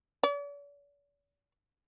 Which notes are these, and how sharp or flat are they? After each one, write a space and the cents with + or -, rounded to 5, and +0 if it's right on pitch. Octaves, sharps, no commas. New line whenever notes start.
D5 -45